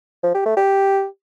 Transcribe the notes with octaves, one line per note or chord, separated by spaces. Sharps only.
F3
G4
A3
G4